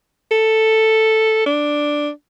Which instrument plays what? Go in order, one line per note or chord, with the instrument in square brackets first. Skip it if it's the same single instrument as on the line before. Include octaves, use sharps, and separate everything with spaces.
[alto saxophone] A4
D4